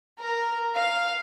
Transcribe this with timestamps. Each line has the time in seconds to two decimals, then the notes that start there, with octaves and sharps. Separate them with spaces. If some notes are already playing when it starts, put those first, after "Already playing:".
0.19 A#4
0.76 F5